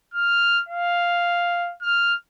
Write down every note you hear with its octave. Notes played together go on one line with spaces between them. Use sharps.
F6
F5
F6